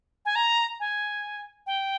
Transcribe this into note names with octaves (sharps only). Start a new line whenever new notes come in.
G#5
A#5
G#5
G5